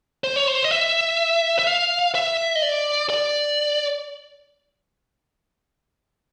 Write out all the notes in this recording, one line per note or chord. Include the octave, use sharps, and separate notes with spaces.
C5
C#5
C5
D#5
E5
E5
F5
E5
D#5
D5
D5